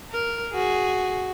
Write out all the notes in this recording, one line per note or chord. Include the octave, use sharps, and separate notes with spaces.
A#4
F#4 G#4